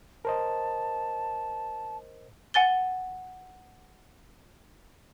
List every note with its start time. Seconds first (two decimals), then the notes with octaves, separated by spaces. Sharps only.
0.25 A#4 C5 D#5 A5
2.54 F#5 G#5 A6 G7